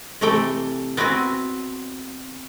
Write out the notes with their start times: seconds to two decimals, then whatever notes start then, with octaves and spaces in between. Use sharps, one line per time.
0.21 C3 E3 A3 A4 G5
0.97 B3 C4 E4 F#4 G#5